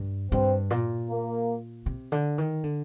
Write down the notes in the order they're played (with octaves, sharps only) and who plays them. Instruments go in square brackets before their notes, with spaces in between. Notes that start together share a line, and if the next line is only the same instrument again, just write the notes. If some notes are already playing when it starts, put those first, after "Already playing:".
Already playing: [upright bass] G2
[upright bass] G2 [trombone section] C4
[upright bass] A#2
[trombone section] A#3
[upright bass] C3
D3
D#3
D3